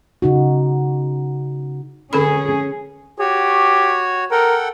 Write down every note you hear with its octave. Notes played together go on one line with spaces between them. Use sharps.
C#3 D#4 F#4
D3 C#4 G#4 A4 B5
F#4 G4 C#5
A4 A#4 F#5 G5